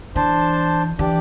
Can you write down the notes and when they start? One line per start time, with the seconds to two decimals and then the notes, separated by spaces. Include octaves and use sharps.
0.16 E3 D4 C5 A5
0.99 E3 D4 G4 D5